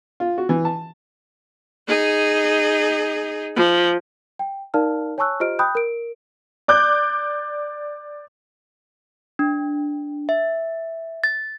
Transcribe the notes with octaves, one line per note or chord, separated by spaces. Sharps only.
F4
F#4
E3
A5
D#4 G#4
F3
G5
D#4 A#4 D5 F5 A5 F6
C#5 G#5 A5 C#6 E6 F#6
F4 G4 C5 D#5 F6 D7
G5 B5 D#6 F#6 G6
A#4 D7
D5 D6 F#6 G6
D4
E5
A6